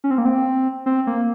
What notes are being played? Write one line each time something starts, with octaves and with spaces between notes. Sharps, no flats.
C#4
C4
A#3
C4
C4
A#3